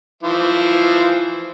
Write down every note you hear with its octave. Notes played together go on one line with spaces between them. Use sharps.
E3 F3